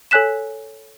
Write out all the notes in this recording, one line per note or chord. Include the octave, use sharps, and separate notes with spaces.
A4 C#5 G#5 F#6 B6 E7